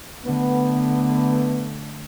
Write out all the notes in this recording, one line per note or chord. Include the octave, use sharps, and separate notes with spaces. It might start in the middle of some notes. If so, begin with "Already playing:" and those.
D3 A3 B3